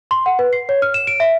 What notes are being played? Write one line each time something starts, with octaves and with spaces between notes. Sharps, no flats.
C6
F#5
B4
C7
C#5
F6
E7
D7
E5